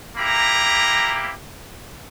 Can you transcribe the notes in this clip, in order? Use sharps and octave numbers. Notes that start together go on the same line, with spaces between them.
A#3 E4 G4 A#5